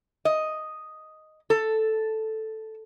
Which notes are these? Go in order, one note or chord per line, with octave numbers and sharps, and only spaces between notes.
D#5
A4